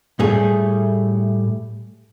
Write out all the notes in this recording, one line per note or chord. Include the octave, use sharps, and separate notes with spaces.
A2 G3 A3 G#4